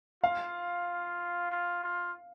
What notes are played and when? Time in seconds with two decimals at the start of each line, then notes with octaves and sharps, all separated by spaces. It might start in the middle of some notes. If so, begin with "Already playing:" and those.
0.24 F4 F5
1.51 F4
1.84 F4